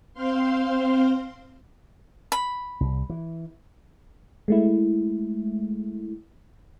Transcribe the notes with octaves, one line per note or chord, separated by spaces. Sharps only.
C4 C5 F5 C6
B5
C2
E3
G#3 A3 E4